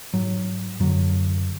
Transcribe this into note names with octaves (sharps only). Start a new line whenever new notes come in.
G#2 F#3
F#2 D3 F#3